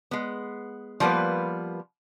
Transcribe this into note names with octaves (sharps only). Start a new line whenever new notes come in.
G#3 B3
F3 G3 A#3 B3 B4